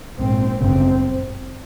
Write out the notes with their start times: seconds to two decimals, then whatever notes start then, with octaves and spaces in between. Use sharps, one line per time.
0.18 A#1 G#2 C4
0.59 G1 F#2 C#3 C4